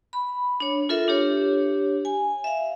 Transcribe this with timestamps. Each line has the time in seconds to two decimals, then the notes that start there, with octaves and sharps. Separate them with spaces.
0.13 B5
0.60 D4 C#5
0.89 F4 A4 A#4 E5
1.08 D4 G4 C#5
2.05 G#5
2.44 E5 F5